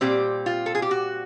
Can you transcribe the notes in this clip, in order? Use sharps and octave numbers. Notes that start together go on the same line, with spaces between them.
A#2 G3 C4 G4
F4
A4
G#4
G4
F#4